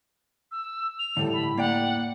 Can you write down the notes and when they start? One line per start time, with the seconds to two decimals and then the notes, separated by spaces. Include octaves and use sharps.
0.51 E6
0.99 F7
1.17 A2 D3 G3 A4
1.33 B5
1.58 A#3 D5 F#5 G5